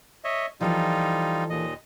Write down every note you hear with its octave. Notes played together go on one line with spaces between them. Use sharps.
C#5 D#5 E5
E3 F3 G3 D#4 F4 A4
D#2 A#2 D#5